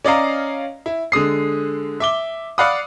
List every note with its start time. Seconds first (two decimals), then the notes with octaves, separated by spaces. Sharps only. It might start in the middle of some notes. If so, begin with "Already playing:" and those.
0.05 C#4 D5 D#5 F5 A#5
0.86 E4
1.12 D3 G#3 D#6 C7
2.00 E5 D6 G7
2.58 D5 F5 F#5 B5 D#6